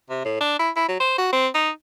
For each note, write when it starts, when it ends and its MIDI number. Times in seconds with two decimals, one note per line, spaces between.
0.10 0.20 48
0.25 0.38 45
0.41 0.59 62
0.59 0.70 64
0.77 0.88 64
0.88 0.98 54
1.00 1.15 72
1.18 1.28 66
1.33 1.48 60
1.55 1.70 63